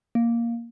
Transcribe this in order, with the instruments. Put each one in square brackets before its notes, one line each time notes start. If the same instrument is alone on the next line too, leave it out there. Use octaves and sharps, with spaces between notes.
[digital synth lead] A#3